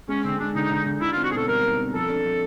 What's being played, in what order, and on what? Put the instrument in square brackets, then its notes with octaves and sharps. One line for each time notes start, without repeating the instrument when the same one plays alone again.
[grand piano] G#3 [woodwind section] C#4
[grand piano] D3 [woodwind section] C4
[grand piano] G#3 [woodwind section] D4
[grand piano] D3 [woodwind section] D#4
[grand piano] D3
D3
[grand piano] D#4 [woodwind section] E4
[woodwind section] F4
[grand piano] C4
[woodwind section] F#4
[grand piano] B2 [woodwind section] G#4 A4
[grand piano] G3 [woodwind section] A#4
[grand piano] D#4
C4
[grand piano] F3 [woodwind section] A4
[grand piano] D4
F3